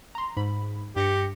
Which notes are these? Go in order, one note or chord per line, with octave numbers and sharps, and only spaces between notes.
A#5 C6
G#2 B5
G2 G4 A#6 C#7